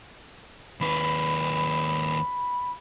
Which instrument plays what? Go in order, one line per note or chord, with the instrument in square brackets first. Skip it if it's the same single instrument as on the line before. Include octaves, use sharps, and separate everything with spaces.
[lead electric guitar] D#2 B4 [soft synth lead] B5